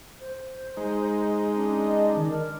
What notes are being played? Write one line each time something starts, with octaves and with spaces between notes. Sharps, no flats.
C5
G#3 D#4
C#4 D4
D#5
D#3
A#4